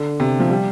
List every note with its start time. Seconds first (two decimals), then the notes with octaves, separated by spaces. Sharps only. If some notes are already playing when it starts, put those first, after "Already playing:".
Already playing: D3
0.20 C3
0.40 F3
0.50 G3